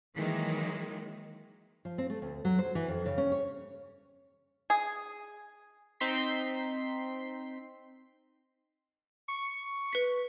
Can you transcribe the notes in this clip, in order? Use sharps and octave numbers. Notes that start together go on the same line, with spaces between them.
D#3 E3 F#3 G#3 A#3
F3
C4
A3
D2
F#3
C5
E3
F2
C#3
C#4
C#5
G#4
C4 D#4 C6 B6
C#6
B4 B6